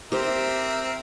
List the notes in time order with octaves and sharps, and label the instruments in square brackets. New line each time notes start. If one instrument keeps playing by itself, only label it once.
[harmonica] C4 A#4 E5 [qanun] G4 C5